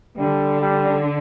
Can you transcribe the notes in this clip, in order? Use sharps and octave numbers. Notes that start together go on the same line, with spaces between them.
D3 G3
G3